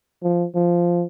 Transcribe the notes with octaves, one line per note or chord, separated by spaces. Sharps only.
F3
F3